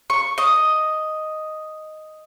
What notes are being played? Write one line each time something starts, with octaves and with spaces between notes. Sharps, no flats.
C#6
D#5